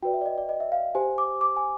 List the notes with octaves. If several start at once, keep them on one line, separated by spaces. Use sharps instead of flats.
F#4 B4 D5 G5
E5
D5
D#5
D5
D#5
E5
F5
G4 C5 G#5
D6
D6
G#5